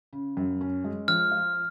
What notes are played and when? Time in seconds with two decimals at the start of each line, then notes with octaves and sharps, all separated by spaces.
0.13 C#3
0.37 F#2
0.61 C#4
0.84 G#3
1.08 F3 F6
1.31 F4